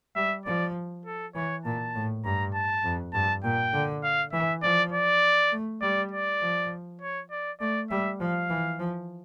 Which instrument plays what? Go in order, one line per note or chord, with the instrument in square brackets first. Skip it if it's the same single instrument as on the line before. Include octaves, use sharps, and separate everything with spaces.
[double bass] G3 [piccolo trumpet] E5
[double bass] F3 [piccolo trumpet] D5
[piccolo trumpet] A4
[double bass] E3 [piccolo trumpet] C#5
[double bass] A#2 [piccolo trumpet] A5
[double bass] A2
[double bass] G2 [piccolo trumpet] A#5
[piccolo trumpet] A5
[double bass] F2
[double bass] G2 [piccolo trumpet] A5
[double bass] A#2 [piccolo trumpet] G5
[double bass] D3
[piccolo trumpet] F5
[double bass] E3 [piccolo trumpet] E5
[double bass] F3 [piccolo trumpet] D5
[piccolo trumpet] D5
[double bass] A3
[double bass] G3 [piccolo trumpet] D5
[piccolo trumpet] D5
[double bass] F3
[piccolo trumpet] C#5
D5
[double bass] A3 [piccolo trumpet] D5
[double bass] G3 [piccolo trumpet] E5
[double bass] F3 [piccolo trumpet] F5
[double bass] E3
F3